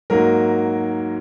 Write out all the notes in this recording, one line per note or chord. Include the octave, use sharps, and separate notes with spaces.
G#2 F#3 A#3 A#4